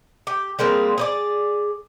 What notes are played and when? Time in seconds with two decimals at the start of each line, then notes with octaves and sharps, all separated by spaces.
0.27 G4
0.59 G3 G#3 A#3 C4
0.98 G#4 C5 D5